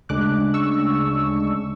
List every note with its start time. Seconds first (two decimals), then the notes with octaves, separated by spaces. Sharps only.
0.09 D2 C#3 G#3 D4 D6 F#6
0.54 C#6 E6